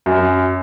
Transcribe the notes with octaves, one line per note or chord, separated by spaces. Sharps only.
F#2